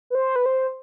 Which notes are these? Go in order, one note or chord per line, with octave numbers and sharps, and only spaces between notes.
B4
C5
B4
C5